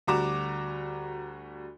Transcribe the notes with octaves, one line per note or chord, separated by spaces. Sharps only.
D2 G3 F#4 A#5 D6 E7